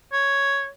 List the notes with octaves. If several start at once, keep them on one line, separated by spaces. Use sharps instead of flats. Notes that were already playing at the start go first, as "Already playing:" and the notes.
C#5